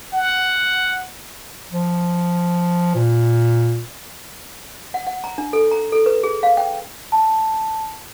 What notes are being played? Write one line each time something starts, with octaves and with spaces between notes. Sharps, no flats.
F#5
F3
A#2
F#5
F#5
A#5
D4
A4
A#5
A4
B4
G#4
F5
G5
A5